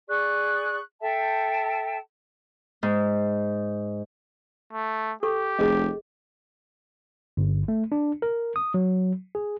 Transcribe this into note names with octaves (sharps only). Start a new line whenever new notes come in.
G#4 D5 C#6 F#6
A4 E5 G5 A5
G#2
A3
G4 A4 C#6
F1 G#4 D#5
G1
A3
D4
A#4
D#6
F#3
G#4